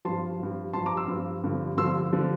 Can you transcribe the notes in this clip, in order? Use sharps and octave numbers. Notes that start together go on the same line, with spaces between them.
G2 F3 A5 C6
G2 F3
G2 F3 A5 C6
A#5 D6
C6 E6
G2 F3
G2 D3 F3
G2 D3 F3 C6 E6
D3 F3